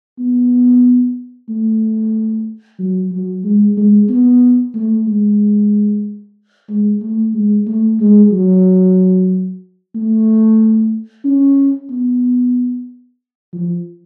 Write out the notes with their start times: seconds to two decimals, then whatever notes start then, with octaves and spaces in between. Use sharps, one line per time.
0.19 B3
1.49 A3
2.79 F#3
3.12 F#3
3.44 G#3
3.77 G#3
4.09 B3
4.74 A3
5.07 G#3
6.69 G#3
7.02 A3
7.34 G#3
7.67 A3
8.00 G#3
8.32 F#3
9.95 A3
11.25 C#4
11.90 B3
13.53 F3